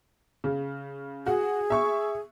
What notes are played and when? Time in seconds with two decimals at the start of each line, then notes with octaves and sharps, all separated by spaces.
0.44 C#3
1.26 F#4 G#4
1.70 E5 C#6